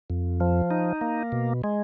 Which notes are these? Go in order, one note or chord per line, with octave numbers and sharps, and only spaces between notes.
F2
F3
D#4
A#3
B2
G#3